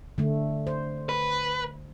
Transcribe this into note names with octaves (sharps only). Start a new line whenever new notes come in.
D3 A3
C5
B4